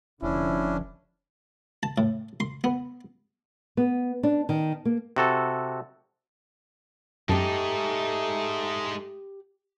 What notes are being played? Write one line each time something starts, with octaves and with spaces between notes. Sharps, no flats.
F1 D3 F3 C#4 D4 E4
A5
A2
C6
B3
B3
D4
D#3
A#3
C3 F#4 A4
F#2 G#3 A3 D#4 G4 A5